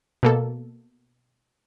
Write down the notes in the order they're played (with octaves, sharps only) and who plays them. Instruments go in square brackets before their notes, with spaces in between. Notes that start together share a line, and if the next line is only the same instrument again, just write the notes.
[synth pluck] B2 A#3 A4